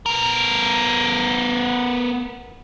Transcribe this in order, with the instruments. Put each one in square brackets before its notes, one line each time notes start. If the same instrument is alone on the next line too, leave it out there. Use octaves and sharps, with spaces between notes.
[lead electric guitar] B3 A#4